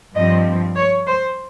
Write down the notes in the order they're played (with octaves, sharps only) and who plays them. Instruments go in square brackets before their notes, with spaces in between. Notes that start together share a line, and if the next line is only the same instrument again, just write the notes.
[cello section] G2 F3 C4 D#5
C#5
C5